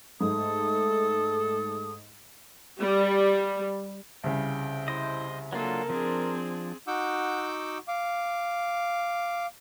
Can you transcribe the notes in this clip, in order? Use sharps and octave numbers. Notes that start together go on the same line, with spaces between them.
G#2 A3 A4 D#6
G3
C2 C#3 G5
E4 C5 D#5
F#3 A#3 D4 F4 A4 A#4
F3 C4 D4 G#4
D#4 F#4 F#5 D6 E6 G6
F5 D6